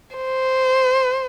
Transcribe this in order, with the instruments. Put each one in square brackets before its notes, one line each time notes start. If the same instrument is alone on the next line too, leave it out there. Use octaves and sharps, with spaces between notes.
[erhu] C5